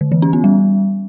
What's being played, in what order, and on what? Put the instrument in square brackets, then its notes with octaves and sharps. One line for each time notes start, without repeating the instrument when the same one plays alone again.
[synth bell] D3
E3
C#4
B3
G3